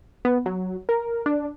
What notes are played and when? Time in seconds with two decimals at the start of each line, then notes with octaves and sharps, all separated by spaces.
0.25 B3
0.46 F#3
0.89 A#4
1.26 D4